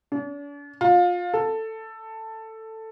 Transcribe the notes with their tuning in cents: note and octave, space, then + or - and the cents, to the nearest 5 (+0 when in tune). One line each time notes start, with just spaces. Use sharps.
D4 -45
F4 +25
A4 +10